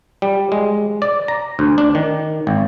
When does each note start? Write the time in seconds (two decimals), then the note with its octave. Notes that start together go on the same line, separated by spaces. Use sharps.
0.22 G3
0.52 G#3
1.02 D5
1.28 A#5
1.59 D2
1.78 D4
1.95 D#3
2.47 G#1